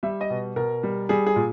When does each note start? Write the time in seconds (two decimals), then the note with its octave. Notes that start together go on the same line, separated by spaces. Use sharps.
0.03 G3 E5
0.21 D#5
0.30 B2
0.56 B2 A#4
0.83 G3
1.09 G3 G#4
1.26 G#4
1.36 A#2